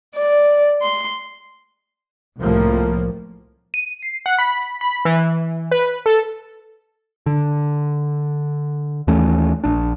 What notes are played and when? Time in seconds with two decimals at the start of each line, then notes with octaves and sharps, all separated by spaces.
0.15 D5
0.82 C6
2.38 C2 A2 F3 A#3
3.74 D#7
4.03 C7
4.26 F#5
4.38 B5
4.81 B5
5.05 E3
5.71 B4
6.06 A4
7.26 D3
9.07 D#2 E3 A3 C#4
9.64 A#1 D4